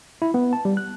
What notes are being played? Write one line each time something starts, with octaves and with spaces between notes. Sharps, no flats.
E4
B3
A5
G3
F#6